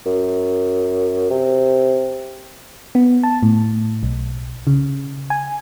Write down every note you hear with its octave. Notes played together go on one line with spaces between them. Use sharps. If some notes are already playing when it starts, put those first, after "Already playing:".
F#2
C3
B3
A5
A2
B1
C#3
G#5